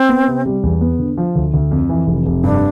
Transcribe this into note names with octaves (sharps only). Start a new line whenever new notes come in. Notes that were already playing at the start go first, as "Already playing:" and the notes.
Already playing: C4
B3
C3
G3
E2
B3
D3
F3
D2
D2
F2
E3
F1
F1
G2 D4